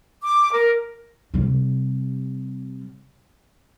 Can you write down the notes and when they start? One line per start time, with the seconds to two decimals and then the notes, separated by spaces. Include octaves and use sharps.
0.23 D6
0.52 A#4
1.34 C3 G3